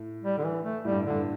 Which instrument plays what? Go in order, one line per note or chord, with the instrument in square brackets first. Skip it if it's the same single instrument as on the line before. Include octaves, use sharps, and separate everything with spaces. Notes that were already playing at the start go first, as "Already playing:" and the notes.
Already playing: [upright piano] A2
[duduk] G3
D3
E3
A3
[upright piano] A2 [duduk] G3
[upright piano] G2
[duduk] D3
[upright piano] G2